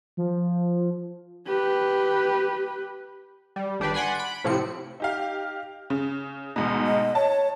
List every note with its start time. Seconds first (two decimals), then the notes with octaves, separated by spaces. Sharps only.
0.17 F3
1.47 G4 B4
3.56 G3
3.80 G#1 D4 G4 B4 D5
3.94 D5 F#5 G#5 B5 C6
4.15 B5 D7
4.44 A2 C3 F3 C4 C#7
5.00 D#4 G4 F5
5.90 C#3
6.56 D2 G#2 B2
6.87 D#5
7.15 C#5 A5